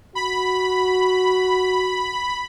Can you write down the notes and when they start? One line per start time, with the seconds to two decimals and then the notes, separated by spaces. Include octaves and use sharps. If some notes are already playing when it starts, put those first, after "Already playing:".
0.15 F#4 B5